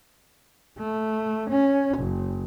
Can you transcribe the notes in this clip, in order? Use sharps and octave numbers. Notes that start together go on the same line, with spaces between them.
A3
C#4
F#1